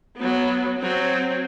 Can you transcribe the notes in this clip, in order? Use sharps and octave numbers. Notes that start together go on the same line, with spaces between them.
F#3 B3
F#3 C4